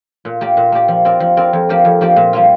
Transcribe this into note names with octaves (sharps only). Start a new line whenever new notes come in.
A#2
A#3 G4 D5
A#2
A#3 G4 D5
F3
C4 A#4 D5
F3
C4 A#4 D5
F2
F3 A#3 G4 D5
F2
F3 A#3 G4 D5
A#2
G3 A#3 F4